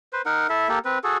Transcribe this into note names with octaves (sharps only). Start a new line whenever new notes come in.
B4 C5
D#4 A#4 F#5
E4 A4 E5
A#3 G4 A4
C4 B4
F#4 G#4 A4